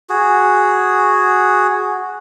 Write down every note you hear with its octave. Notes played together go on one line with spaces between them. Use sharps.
F#4 G#4